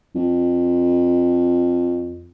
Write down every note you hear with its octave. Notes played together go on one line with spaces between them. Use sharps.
F2